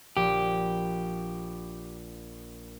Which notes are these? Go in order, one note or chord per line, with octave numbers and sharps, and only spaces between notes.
A#1 G4